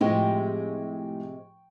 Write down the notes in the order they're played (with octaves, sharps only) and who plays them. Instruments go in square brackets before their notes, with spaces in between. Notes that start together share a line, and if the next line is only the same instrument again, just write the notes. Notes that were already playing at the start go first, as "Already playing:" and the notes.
[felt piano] A2 F3 [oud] C3 G#3 [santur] G5 C#6